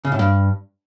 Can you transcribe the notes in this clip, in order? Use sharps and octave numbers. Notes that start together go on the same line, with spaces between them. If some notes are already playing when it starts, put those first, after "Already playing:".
C#3
A2
G2